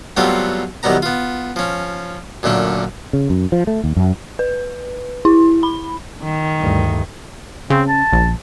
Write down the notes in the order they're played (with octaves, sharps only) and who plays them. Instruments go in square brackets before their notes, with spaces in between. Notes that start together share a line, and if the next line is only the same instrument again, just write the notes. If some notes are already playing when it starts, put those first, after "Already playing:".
[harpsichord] F#3 G3 A3 B3 C4 F4
C2 D#3 F#3 G3 B3 A#5
B3 F4
F3 C#4
F#2 A#2 D3 A3 D4
[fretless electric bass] C#3
F#2
F3
A3
D#2
F#2
[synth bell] B4
E4
B5
[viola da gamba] D#3
[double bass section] D2 G2 E3
[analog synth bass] C#3 [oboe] C4
[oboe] A5
[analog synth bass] A#1